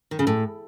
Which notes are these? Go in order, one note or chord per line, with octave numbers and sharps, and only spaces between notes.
D#3
C#3
A2